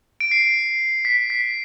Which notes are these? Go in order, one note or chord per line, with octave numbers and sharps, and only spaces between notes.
D7
C7
B6
B6